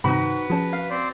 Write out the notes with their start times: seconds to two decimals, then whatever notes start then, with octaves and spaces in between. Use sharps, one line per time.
0.04 G2 C3 D#3 D#4 F#4 B4 C5 B5
0.50 F3 C#4 G#4 A5
0.73 F5
0.90 C4 C5 D5